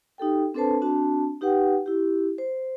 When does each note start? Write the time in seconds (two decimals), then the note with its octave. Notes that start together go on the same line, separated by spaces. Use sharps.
0.18 D#4 G4 A4 G5
0.54 C4 D4 A4 B4 C5 A5
0.82 C4 D4 F#4 A5
1.41 D#4 G4 B4 F#5 G5
1.86 E4 G4
2.38 C5